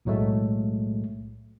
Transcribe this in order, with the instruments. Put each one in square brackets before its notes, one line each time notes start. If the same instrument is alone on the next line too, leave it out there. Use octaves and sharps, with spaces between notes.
[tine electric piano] B1 A2 F#3 G#3 A3